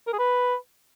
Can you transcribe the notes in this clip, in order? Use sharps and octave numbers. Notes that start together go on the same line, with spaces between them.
A#4
G#4
B4